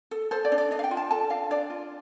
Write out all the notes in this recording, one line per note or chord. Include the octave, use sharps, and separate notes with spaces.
A4
A4 C5
D5
D4
D5
D4 D#5
F5
G5
F4
A5
A4 A5
D4 F5
D4 D5
F4